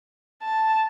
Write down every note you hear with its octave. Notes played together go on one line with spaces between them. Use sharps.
A5